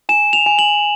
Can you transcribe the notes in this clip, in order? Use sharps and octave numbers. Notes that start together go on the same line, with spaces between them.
G#5 E7
F7
G#5
F#7